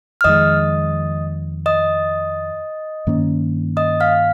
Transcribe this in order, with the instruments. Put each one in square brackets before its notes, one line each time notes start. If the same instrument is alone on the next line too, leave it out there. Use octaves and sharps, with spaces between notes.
[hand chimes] F6
[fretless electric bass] F2 D#3 G#3 [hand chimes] D#5 D#6
[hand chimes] D#5 D#6
[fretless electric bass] G2 D#3 A#3 C#4
[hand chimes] D#5 D#6
F5 F6